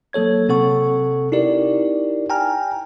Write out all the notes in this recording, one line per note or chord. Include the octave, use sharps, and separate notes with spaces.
F#3 A#3 A4 C#5 G#6
C3 C4 A4 F#5 C#6
D#4 E4 G4 A#4 D5
G5 G#5 A#5 F6